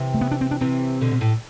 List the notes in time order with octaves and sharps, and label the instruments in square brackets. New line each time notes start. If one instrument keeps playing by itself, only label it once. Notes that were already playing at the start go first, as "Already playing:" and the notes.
Already playing: [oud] C3 E3
[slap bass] A3
B3
D4
C4
D4
[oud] C3 E3 [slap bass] C4
[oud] B2 D3
B2
A2